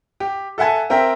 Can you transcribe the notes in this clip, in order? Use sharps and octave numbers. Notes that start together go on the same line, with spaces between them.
G4
A4 E5 F#5 G#5 A5
C4 A#4 E5 G5